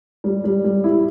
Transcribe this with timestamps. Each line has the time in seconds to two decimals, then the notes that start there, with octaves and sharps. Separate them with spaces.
0.24 G3
0.44 G3
0.64 G3
0.84 E4